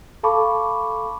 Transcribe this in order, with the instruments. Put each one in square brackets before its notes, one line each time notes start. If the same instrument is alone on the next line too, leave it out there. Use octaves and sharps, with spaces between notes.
[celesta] A4 F5 A5 B5 C#6 D6